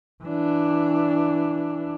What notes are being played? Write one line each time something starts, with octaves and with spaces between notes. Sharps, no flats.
E3 D4